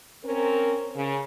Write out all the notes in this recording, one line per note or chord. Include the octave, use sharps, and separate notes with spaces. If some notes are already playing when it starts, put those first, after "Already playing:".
C4 C#4 A#4
C#3